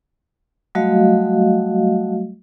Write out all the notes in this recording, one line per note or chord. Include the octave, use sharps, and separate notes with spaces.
F#3 G3 A3 F#4 D#5 F5